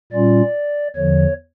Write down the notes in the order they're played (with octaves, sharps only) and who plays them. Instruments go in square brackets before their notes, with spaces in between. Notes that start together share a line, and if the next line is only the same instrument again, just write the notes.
[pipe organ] A#2 G3 C#4 F4 D5
E2 D3 F3 C#5